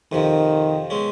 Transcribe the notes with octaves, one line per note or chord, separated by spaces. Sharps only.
F2 C3 D#3 F3
B2 G#3 C#4